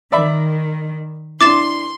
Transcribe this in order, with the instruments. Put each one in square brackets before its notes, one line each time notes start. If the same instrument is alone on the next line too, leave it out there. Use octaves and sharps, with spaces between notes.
[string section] D#3 [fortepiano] D5 E5 B5
[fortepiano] D4 E4 [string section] C6 [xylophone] D6 A6 E7